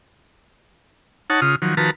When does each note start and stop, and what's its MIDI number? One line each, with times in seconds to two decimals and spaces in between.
1.30 1.40 63
1.30 1.40 73
1.30 1.40 78
1.30 1.40 81
1.42 1.56 49
1.42 1.56 65
1.42 1.56 87
1.42 1.56 89
1.62 1.75 51
1.62 1.75 53
1.62 1.75 54
1.77 1.91 51
1.77 1.91 53
1.77 1.91 66
1.77 1.91 71
1.77 1.91 81
1.77 1.91 82